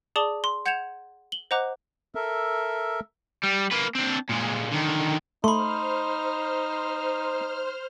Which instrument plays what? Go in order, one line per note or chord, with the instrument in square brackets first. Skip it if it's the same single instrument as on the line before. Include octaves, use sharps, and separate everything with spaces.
[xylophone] G#4 D5 A5 D6 D#6 G7
C6
F#5 G6 G#6 C#7 E7 F7
F#7 G7
C5 D#5 F#5 A#5 D6 F#6
[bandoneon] A4 A#4 E5
[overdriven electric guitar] G3
A#3 B4
C4 D4
A#2 G#3
D3 D#3
[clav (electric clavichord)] A3 [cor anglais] D#4 [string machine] C5 F6 [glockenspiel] B5 C6